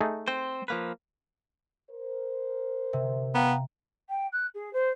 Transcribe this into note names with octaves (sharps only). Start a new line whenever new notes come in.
A3 D#4 G#4
C4 C5
F3 A#3 B4
A#4 C5
C3
B3 F5 G5 A#5
G5
F#6
G#4
C5